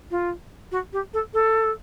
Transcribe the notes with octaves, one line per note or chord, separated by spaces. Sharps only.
F4
F#4
G4
A4
A4